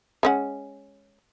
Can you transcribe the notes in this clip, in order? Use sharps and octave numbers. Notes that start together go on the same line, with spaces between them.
G#3 C#4 F#5